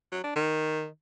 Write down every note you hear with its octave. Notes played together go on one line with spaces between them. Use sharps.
F#3
D4
D#3